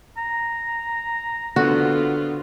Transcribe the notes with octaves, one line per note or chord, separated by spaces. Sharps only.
A#5
D3 B3 F4 F#4 C5